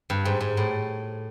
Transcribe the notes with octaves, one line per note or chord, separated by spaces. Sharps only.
G2
G#2
G#2
A2